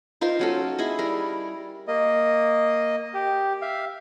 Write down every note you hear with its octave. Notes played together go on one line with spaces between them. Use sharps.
D#4 F4 A#4 C5
F#3 C#4 A4
E4 G#4 D#5
G3 A#4
A#3 D#5
G4
E5 F5